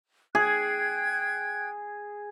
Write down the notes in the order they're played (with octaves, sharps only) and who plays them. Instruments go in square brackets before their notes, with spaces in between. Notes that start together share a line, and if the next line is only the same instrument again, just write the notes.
[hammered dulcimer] G#4 [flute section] G5 F#6 G#6